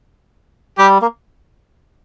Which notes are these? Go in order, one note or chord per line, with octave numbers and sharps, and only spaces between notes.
G3 G4
A#3